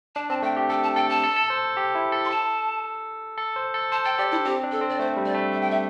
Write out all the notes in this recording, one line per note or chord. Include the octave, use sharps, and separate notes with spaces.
D4 A5
C4 A5
A3 G5
G4
A4 G5
A5
A4 G5
A5
A4
A4
C5
G4
E4
A4
C6
A5
A4
C5
A4
C5 A5
A4 G5
G4 D5
D4 E4
C4 G4
D4
A4
C4
D5
A3 C5
G3
D5
A3
E5
G5
E5